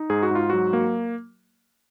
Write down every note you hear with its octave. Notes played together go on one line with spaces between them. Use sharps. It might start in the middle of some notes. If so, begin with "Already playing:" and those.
Already playing: D#4
G#2 G#4
F#4
G#2 F4
F#3 F#4
A#3